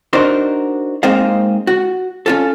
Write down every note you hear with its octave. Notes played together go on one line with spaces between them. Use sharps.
D4 D#4 F#4 A#4 C5
G#3 A#3 C4 D#4 C5 F5
F#4
C#4 F4 A4